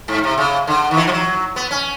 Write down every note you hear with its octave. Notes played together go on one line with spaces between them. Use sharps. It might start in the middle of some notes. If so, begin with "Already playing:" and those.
G#2
C3
C#3
D3
D#3
E3
F3
F#3
B3
C#4